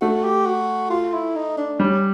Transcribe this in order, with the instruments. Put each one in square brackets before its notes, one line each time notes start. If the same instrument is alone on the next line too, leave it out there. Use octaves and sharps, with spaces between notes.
[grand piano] A3 [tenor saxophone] F#4
[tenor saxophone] G4
F#4
F4
E4
D#4
D4
[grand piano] G3 [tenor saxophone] C#4